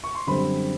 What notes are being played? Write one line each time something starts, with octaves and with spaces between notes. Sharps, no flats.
C#6
C6
F#2 D3 G3 C4 B5